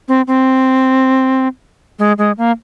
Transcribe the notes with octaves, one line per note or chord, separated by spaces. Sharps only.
C4
C4
G#3
G#3
A#3